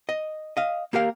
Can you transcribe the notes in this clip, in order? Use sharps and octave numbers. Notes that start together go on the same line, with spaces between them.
D#5
D#5 F5
A#3 G4 A#4 F5